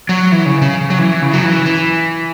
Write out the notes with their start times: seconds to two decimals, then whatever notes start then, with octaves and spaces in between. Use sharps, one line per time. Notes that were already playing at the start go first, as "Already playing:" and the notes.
0.09 F#3
0.32 E3
0.46 C#3
0.62 C#3
0.90 F#3
0.99 E3
1.22 C#3
1.33 F#3
1.44 E3
1.66 E3